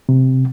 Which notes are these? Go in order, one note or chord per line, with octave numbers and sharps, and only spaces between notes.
C3